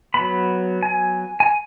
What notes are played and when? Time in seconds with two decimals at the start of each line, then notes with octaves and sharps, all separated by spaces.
0.14 F#3 B3 B5
0.83 G#5
1.40 G#5